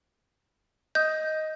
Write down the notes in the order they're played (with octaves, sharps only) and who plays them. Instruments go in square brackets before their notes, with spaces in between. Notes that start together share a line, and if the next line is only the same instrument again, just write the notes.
[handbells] D#5 D#6 [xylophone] G6